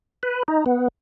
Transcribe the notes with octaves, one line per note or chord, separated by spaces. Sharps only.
B4
D#4
B3